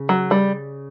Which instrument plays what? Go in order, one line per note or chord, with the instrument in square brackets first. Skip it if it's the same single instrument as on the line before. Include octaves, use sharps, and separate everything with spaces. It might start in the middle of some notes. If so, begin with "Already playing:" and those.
Already playing: [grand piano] C#3
[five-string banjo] F#3
G3